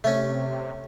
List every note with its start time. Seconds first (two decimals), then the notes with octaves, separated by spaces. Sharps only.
0.04 C3 A3 C#4